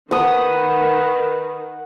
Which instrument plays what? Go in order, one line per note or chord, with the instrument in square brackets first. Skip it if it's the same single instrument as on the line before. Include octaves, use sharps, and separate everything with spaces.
[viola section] D#3 [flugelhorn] B4 [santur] F#5 D#6